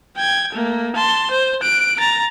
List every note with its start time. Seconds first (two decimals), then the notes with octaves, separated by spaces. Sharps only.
0.16 G5 G#6
0.53 A3 A#3
0.95 A5 C6
1.30 C5
1.62 F#6 D7
1.99 A#5 A6